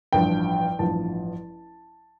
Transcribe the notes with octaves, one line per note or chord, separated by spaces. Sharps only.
A1 G2 F3 G5
A1 G2 F3 A5